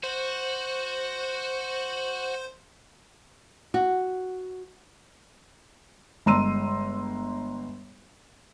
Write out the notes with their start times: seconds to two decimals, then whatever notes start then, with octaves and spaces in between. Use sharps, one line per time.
0.04 F#4 C5
3.74 F#4
6.26 G1 G#3 A#5 C6 E6 D#7